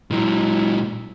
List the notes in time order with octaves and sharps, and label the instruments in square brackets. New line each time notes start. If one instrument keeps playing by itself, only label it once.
[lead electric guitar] A#2 F#3 [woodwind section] G#3 E4